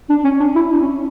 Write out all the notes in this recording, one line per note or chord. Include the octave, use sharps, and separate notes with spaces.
D4
C#4
D4
E4
D4
C#4